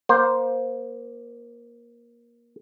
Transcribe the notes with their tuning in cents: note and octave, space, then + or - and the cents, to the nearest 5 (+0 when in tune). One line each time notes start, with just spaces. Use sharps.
A#3 +20 C5 +0